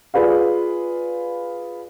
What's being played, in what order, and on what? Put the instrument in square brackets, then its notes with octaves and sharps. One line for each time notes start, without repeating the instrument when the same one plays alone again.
[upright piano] F4 G#4 B4 D5 F5